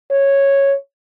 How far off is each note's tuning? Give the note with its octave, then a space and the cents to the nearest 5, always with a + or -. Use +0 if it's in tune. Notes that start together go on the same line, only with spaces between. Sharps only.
C#5 -5